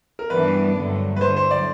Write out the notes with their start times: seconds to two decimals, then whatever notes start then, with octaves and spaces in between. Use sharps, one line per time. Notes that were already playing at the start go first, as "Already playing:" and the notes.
0.19 A#4
0.30 G2 E3 G3 B3 D4 B4
0.76 G2 D3 F#3 A3
1.16 B4
1.21 D3 F#3 A3 C5
1.36 C5
1.51 D5